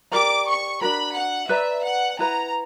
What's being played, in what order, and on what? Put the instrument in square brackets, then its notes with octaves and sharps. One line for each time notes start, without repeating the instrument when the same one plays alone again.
[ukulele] G4 A#4 D5 A#5 [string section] D6
[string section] C#6
[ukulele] D4 F#4 A#4 [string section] B5
[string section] F#5
[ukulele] B4 D5 A#5 [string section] E5
[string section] F#5
[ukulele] E4 B4 F#5 [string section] A#5